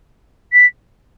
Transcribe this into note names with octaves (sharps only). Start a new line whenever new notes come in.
B6